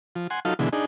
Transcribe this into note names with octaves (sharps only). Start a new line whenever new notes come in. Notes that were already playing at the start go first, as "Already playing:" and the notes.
F3
F#5 G#5 C6
F#3 D#4 F4 A4 F5
B2 D3 E3 G#3
D4 D#4 G#4